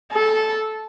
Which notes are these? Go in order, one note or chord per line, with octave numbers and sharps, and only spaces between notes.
A4